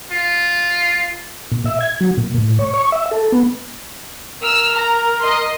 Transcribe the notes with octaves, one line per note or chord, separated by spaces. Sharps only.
F4
A#2
E5
G#6
F#3
A#2
A2
C#5
C#6
E5
A4
B3
A#4 E6 F6
A#5
D#5 C6